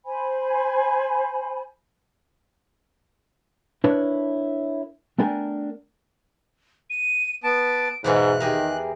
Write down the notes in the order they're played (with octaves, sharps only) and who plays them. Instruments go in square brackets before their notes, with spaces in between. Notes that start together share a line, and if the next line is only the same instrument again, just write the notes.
[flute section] C5 G#5 B5
[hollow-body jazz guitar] D4 E4 A#4 B4 C#5
A3 B3 D4 A#4 G5 G#5
[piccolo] D#7
[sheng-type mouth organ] B3 A5 [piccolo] D7
[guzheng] E2 B2 E3 [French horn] G#2 [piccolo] F5 [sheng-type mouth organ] F#6
[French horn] D#3 [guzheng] G4 G#4 A#4